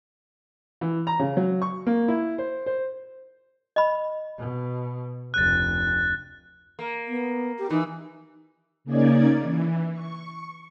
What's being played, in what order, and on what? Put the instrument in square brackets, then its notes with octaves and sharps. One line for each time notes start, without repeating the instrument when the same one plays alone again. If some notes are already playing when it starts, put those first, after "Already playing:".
[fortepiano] E3
A#5
C#3
F#3
C#6
A#3
E4
C5
C5
[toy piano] D#5 B5
[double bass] B2
[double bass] F1 D2 [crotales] F#6 A6
[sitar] A#3
[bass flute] B3
G4
[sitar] E3 [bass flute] D#4
[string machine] C#3 A#3 C#4 D#4 D5 G#6
E3
C#6